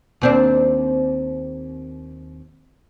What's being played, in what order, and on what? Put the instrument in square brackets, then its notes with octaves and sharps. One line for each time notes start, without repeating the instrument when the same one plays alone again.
[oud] D#2 C4 D4